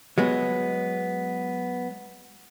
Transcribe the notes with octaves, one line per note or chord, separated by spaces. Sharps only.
F#3 G#3 B3